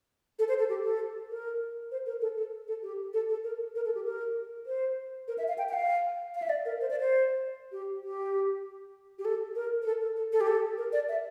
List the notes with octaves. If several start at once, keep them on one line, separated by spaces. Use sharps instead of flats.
A4
C5
A4
G4
A4
A#4
C5
A#4
A4
A4
A4
G4
A4
A4
A#4
A#4
A4
G4
A#4
C5
A#4
E5
F5
G5
G5
F5
F5
E5
D5
A#4
C5
D5
C5
G4
G4
G4
A4
A#4
A#4
A4
A4
A4
A4
G4
A4
A#4
D5
E5